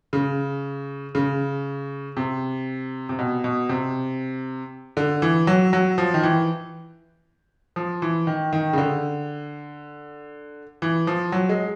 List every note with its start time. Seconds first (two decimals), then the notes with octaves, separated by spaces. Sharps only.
0.13 C#3
1.15 C#3
2.17 C3
3.09 C3
3.19 B2
3.44 B2
3.69 C3
4.97 D3
5.22 E3
5.47 F#3
5.73 F#3
5.98 F3
6.14 D#3
6.23 E3
7.76 F3
8.02 E3
8.27 D#3
8.53 D#3
8.73 C#3
8.78 D3
10.82 E3
11.07 F3
11.32 F#3
11.49 G#3